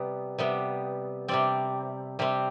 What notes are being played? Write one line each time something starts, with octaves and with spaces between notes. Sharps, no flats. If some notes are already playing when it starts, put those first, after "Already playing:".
Already playing: C3 G3 B3
C3 G3 B3
C3 G3 C4 D5
C3 G3 C4